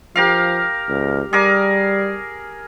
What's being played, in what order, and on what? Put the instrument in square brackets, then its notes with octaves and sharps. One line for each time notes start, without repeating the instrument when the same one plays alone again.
[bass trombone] F3 [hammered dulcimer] G4 A#4 F5
[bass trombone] C#2
[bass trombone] G3 [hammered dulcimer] G#4 A#4 D6